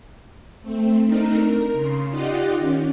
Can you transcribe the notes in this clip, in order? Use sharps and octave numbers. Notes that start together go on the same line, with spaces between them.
A3 C4
A3 C4 D4 D#4 A#4
A#4
C#3 C6
D#4 F4 G4 D5 D#5 F#5
D#3 C#4